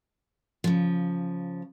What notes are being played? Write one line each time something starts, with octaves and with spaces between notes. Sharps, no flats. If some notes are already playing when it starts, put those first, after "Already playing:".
C#3 F3